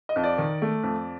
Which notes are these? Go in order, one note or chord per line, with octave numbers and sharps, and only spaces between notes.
D#5
F2
D5
D#3
A3
F2